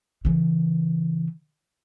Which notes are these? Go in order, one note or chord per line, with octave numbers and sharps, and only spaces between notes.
C#3 E3